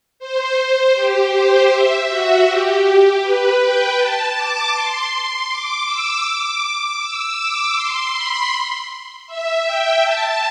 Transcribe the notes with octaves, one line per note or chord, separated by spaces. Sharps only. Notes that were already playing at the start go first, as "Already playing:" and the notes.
C5
G4
C5
E5
F#4
G4
G4
B4
G5
A5
D6
C6
C6
D6
E6
D6
D6
E6
D6
C6
B5
E5
G5
A5